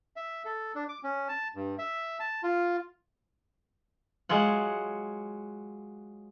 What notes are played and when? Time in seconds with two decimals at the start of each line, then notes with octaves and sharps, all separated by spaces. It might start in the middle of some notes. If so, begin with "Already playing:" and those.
0.16 E5
0.45 A4
0.75 D4
0.89 D6
1.04 C#4
1.28 A5
1.55 G2
1.79 E5
2.20 A5
2.43 F4
4.29 F#3 G#3 F4 F#5